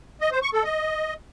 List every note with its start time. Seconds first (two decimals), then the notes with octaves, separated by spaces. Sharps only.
0.21 D#5
0.32 C5
0.42 C#6
0.53 A4
0.64 D#5